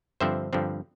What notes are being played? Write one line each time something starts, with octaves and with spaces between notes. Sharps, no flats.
G2 D3 F3 C4 C5 E5
G2 D3 F3 C4